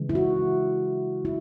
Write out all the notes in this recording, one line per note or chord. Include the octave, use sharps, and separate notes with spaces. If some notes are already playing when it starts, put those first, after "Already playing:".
Already playing: C#3 E3 G#3
E4
F#4
E4